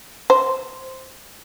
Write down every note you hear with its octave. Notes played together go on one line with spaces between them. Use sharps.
C5